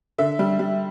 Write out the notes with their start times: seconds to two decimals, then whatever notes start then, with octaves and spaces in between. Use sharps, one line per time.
0.18 D3 E5
0.39 G3
0.59 G3